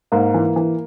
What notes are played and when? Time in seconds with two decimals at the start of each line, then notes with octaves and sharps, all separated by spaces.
0.12 G#2 A#3
0.34 E3
0.56 E3